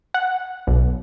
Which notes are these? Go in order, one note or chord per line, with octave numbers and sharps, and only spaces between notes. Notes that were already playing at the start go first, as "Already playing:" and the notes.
F#5
B1